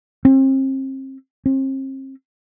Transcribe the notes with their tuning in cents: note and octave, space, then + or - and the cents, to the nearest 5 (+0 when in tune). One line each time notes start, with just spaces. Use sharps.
C4 +35
C4 +40